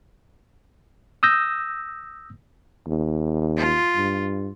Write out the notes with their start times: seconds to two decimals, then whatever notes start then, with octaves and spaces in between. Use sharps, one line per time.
1.23 D#6 E6 G6 A#6
2.86 D#2
3.57 F4
3.96 G2